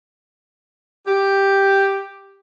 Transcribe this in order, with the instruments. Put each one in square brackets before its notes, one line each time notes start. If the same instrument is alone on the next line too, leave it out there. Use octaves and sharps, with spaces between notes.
[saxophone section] G4